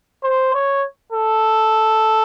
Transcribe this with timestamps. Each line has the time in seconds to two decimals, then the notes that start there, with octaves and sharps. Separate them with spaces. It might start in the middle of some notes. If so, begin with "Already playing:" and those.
0.24 C5
0.54 C#5
1.12 A4